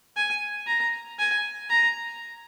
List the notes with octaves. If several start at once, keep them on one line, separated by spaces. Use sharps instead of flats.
G#5
A#5
G#5
A#5